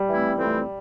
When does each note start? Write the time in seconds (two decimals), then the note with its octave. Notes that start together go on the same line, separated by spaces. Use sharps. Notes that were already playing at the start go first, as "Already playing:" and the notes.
Already playing: G3
0.09 E3 A3 C4 E4
0.37 F2 E3 A3 C4